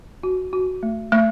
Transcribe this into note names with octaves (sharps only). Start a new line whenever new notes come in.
F#4
F#4
A3
A3